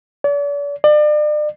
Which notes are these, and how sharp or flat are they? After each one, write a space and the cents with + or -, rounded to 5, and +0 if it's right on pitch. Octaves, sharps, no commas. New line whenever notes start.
D5 -45
D5 +35